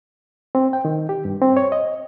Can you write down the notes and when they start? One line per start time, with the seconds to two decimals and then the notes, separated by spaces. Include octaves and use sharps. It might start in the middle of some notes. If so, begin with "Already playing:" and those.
0.55 C4
0.73 G5
0.85 D#3
1.09 G4
1.25 G2
1.41 C4
1.57 C#5
1.72 D#5